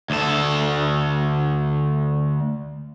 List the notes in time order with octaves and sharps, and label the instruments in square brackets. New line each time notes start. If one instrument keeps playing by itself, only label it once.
[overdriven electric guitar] D2 A4